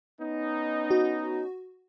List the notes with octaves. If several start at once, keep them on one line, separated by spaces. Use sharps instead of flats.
B3 C#4 D#4
F#4